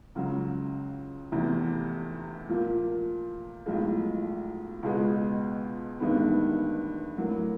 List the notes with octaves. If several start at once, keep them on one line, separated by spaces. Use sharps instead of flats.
C#2 C#3 F#3
F1 E2 C3
A#2 F3 A#3
B1 A2 F3 G#3
C#2 B2 G#3 B3
A1 G2 D#3 G#3 B3
A2 F#3 A#3